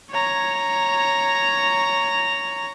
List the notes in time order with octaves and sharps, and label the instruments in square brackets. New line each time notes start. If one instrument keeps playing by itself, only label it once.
[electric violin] C#5 A#5